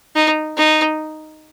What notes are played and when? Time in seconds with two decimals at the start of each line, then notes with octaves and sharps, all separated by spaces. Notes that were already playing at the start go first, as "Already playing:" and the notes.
0.16 D#4
0.57 D#4